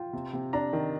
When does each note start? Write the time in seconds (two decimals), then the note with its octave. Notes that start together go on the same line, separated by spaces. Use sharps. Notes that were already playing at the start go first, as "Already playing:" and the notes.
Already playing: F4 G5
0.13 C3
0.33 C3
0.53 D4 A#5
0.73 D#3